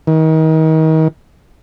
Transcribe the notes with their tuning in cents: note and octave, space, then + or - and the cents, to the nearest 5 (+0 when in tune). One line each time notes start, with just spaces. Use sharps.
D#3 +35